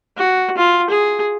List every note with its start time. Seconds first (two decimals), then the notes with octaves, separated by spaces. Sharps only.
0.18 F#4
0.58 F4
0.90 G#4